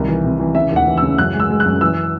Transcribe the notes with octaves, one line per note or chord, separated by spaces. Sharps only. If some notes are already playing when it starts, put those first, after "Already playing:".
Already playing: C2 D#3
E3
C3
E3
C#3 E5
D#2
F#5
E3
C#3 E6
F#2 F#6
G#3
E6
G#3
F#6
F#2
E3 E6